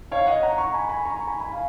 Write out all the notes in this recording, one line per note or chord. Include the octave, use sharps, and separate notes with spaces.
C#5 F5
D#5 F#5
F#5 A#5
A#5 C#6
G#5 B5
G#5 B5
A#5 C#6
A#5 C#6
G#5 B5
G#5 B5
F5 G#5